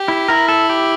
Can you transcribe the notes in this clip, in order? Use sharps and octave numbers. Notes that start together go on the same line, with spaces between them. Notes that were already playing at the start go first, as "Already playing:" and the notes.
Already playing: G4
E4
E4 A#4
A4
G4